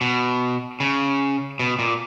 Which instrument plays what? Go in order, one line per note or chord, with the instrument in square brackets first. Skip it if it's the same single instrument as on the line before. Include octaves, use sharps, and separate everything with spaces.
[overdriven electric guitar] B2
C#3
B2
A#2